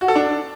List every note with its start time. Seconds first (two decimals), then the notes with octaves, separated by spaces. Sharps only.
0.01 F#4
0.08 A4
0.16 D4